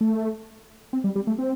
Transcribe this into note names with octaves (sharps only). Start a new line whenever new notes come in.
A3
C4
G3
G3
A3
C4